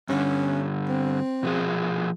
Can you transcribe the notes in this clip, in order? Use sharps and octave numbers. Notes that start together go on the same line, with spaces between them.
G2 D3 C#4
C4
B2 F3 G#4